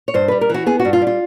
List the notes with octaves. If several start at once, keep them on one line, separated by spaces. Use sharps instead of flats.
C#5
G2 C5
G3 B4
A#4
E3 F#4
B3 G#4
F#4
G2
F4
G3
F4